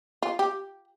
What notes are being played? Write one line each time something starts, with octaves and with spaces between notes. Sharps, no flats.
F4
G4